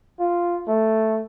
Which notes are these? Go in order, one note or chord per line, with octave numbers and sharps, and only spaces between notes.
F4
A3